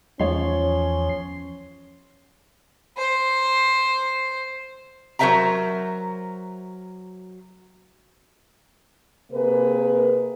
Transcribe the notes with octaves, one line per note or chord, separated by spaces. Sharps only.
E2 F3 C#4 C#5 C6
C5
F#3 A#4 C5 E5 G5 A#5
C3 A#3 G#4 A#4 B4